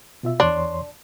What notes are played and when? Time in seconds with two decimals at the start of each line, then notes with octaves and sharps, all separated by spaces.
0.23 B2 F4 E5
0.40 E2 D4 C#5 C6